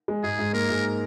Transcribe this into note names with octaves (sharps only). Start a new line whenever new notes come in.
G#3
G#2 G#4
G#2
A#3 A#4
G#2